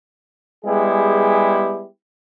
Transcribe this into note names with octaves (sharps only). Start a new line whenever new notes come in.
G3 G#3 B3 E4 G4 G#4